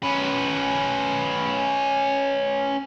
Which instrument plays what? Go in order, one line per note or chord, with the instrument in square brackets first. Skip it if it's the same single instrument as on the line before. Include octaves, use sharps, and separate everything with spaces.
[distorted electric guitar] C#4 B4